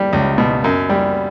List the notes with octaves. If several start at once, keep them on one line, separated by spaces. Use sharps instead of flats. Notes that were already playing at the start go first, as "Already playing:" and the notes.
Already playing: G3
C#2
B2
F#2
G3